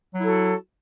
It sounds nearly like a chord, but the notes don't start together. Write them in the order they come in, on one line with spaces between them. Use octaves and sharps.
F#3 E4 A4 F#4